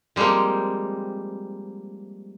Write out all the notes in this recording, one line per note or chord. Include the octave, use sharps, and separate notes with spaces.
F3 G3 G#3 A#3 C4